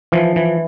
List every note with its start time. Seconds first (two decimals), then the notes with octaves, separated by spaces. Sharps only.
0.12 E3 F3
0.36 E3